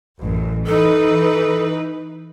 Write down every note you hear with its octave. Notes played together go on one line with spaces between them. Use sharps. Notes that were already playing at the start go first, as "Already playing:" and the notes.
A1 F#2
E3 D#4 A4 B4